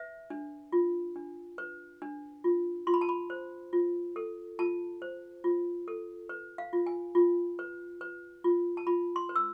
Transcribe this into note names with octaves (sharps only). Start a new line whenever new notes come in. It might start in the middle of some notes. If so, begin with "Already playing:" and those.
Already playing: B4 E5
D4
F4
D4
B4
D4
F4
F4 C6
B5
A5
B5
C5
F4
A4
F4 A5
C5
F4
A4
B4
F5
F4
G#5
F4
B4
B4
F4
A5
F4 B5
C6
B4
E6